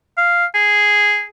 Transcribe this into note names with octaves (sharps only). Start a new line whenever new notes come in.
F5
G#4